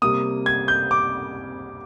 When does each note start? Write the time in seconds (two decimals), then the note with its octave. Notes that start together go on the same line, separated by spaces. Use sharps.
0.02 C3 G3 A#3 D#6
0.46 G#6
0.68 G6
0.91 D6